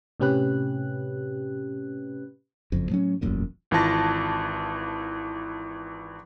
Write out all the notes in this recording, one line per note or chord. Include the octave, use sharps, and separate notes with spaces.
A2 C3 C#4 G4 B4 F#6
F#1 F2
A2 F#3 C#4
E1 A1 F#2 A#2
G#1 E3 F4 A5 A#6